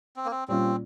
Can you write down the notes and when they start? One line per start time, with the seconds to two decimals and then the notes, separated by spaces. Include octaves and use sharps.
0.16 C4
0.25 A#3
0.31 C4
0.48 A#2 G3 C4 C#4 F4